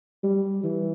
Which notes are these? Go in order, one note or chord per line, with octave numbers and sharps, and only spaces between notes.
G3
E3